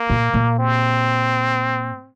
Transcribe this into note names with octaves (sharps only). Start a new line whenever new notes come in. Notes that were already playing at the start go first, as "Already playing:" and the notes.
Already playing: A#3
A#2
A#2
C4